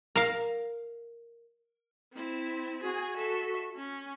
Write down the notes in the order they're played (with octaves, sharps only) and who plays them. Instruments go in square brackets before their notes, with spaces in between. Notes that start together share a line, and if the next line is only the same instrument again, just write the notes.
[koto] A#4 F5
[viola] C4 E4
[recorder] F#4 [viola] G#4 G#5
[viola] A4 E5
C#4